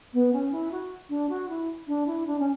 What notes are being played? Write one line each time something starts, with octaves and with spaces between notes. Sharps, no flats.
B3
C#4
E4
F#4
D4
F#4
E4
D4
E4
D4
C#4